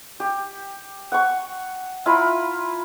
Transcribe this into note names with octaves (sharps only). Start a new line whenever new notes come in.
G4
F#5 C#6
E4 F4 A#5 B5